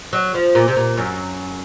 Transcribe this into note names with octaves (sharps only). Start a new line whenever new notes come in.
F#3
F3
A#2
C3
A#2
F#2